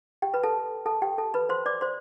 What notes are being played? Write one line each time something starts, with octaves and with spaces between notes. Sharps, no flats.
G4 G5
B4 B5
A4 A5
A4 A5
G4 G5
A4 A5
B4 B5
C5 C6
D5 D6
C5 C6